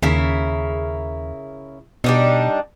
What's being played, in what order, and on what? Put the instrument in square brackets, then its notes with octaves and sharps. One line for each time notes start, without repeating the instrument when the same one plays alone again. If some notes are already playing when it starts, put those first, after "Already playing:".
[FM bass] D#2 [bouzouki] C#3 E4 A#4
[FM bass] B2 [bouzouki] G3 D4 D#4